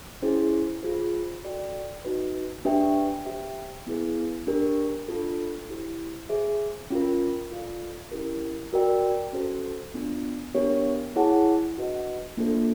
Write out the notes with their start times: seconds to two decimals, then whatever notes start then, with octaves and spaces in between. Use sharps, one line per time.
0.22 C#4 E4 G#4 C5
0.83 F4 G#4 C5
1.43 F#4 A4 D5 G5
2.05 D#4 F#4 B4
2.65 D4 G4 B4 E5 G5
3.25 G4 C5 E5 G5
3.86 B3 E4 G#4 B4
4.47 D4 G4 A#4
5.08 D4 F4 A4
5.69 E4 G4 C5
6.29 G#4 C5 E5
6.90 C#4 F4 A#4
7.51 F4 A4 D5 F5
8.12 C#4 E4 G4 A#4
8.73 F#4 A#4 D5 G5
9.33 C#4 F#4 A4 C5
9.94 B3 D4 F4
10.54 B3 D4 G4 A#4 C#5
11.16 E4 G#4 C#5 F#5 A5
11.76 D4 F#4 B4 D#5 F#5
12.37 A#3 D4 F4 A4 C5